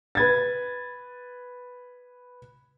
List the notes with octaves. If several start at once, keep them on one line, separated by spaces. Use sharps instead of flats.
B4 G#6 A6